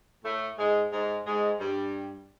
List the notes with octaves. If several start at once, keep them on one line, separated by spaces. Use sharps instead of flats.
A2 A3
G#2 G#3
G#2 G#3
G#2 G#3
G2 G3